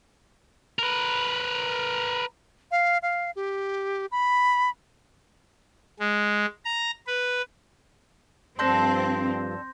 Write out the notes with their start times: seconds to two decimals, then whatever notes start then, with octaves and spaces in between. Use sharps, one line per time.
0.79 A#4 B4
2.71 F5
3.02 F5
3.36 G4
4.12 B5
5.99 G#3
6.65 A#5
7.07 B4
8.59 G2 F3 C4 D4 A4 C6 G6 A#6